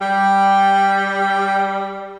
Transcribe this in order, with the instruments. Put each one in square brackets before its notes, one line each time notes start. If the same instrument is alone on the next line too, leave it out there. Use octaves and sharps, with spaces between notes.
[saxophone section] G3 [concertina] G5